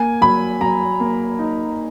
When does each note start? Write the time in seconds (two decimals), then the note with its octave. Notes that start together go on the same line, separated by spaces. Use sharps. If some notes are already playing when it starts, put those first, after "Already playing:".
Already playing: A#3 G#5
0.21 F#3 B5
0.61 F#3 A#5
1.00 A#3
1.39 D#4